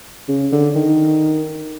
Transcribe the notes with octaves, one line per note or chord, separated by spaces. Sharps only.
C#3
D3
D#3